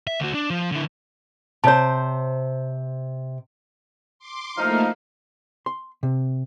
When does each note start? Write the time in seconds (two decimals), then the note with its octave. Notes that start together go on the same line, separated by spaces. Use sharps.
0.07 E5
0.20 D2 F#4
0.35 D4
0.50 F3
0.71 D3 E4
1.64 C3 C5 C#5 A5
4.19 C6 D6
4.58 F3 A3 A#3 D#4 E4 F5
5.66 C6
6.03 C3